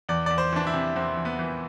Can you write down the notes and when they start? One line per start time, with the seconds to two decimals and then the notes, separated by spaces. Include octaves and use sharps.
0.09 E2 D5
0.26 E2 D5
0.38 C5
0.53 E3 D4
0.67 E4
0.74 C3
0.96 E2 C4
1.17 E2
1.25 B3
1.39 E3